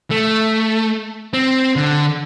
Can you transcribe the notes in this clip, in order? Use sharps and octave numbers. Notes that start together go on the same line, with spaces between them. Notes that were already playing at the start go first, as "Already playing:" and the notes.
A3
C4
D3